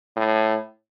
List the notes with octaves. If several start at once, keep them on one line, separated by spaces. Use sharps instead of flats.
A2